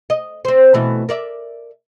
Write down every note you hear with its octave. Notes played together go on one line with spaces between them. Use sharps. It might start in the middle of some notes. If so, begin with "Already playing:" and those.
D#5
C4 C5
B2 E3 A3
A#4 D5 E5